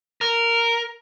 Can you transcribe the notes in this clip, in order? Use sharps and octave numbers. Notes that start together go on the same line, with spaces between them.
A#4